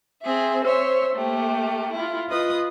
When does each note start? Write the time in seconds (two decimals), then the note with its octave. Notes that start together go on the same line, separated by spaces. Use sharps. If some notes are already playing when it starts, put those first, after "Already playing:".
0.23 C4 G#4 E5
0.64 C5 C#5 E5
1.16 A3 A#3 G4
1.94 E4 F4
2.29 F4 B4 D#5 D#6